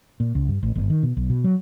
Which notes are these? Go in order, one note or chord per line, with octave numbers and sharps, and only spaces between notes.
A#2
C#2
G2
A1
G1
D#3
B2
B1
B2
F#3